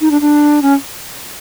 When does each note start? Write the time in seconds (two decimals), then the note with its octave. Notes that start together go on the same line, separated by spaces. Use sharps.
0.01 D#4
0.11 D4
0.21 D4
0.62 C#4